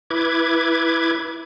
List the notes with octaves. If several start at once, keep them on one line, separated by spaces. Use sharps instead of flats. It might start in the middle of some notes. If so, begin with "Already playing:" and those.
E4 B4 D6 G#6